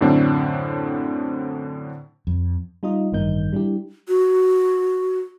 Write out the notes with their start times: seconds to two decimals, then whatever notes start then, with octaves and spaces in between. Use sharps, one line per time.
0.01 F#2 A2 D3 C4 D4
2.27 F2
2.83 G3 D#4 F4 D#5
3.12 A1 G2 D#3 A#3 D#4 G6
3.53 G3 D4 E4 G4
4.08 F#4